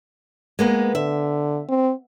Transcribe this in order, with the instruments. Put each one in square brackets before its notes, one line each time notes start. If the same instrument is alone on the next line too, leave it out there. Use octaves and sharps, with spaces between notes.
[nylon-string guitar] G#3 A#3 B3
[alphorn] D3 [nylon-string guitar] E5
[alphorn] C4